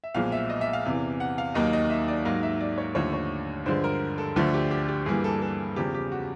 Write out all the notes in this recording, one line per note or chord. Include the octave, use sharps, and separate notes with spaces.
E5
B1 A#2 F3 G#3 F5
E5
D#5
E5
F5
E2 C3 E3
F#5
F5
D#2 D#3 F#3 A#3 D#4 D#5
D#5
E5
D5
G#2 D#3 F#3 A#3 F5
E5
D5
C#5
D#2 D3 F3 A3 C#5
C#5
G2 D3 F3 G#3 C5
A#4
A4
D2 D3 F3 A3
G4
G4
G4
G2 E3 G3 A#3 G#4
A4
A4
E2 C#3 F3 G4
G4
F#4